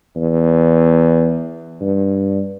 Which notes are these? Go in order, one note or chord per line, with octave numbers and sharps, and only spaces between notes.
E2
G2